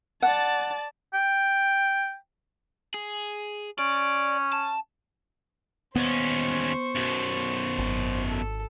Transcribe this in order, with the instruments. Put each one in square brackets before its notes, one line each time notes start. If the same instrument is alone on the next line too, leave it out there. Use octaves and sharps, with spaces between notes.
[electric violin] D5 A5 [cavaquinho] F#5
[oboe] G5
[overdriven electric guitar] G#4
[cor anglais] C#4 [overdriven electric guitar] D5
[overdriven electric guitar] A5
[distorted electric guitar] D#2 C#4 [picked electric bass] B3 [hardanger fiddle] C5 C#6
[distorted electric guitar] F#2 B2
[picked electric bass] G#1
[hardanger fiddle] A4